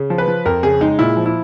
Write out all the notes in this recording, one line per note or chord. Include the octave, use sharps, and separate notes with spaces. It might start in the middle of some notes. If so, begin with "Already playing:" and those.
Already playing: C#3
F3
B4
F3
F2 A#4
C#3 G#4
G#3 D#4
A#2 E4
F3
E4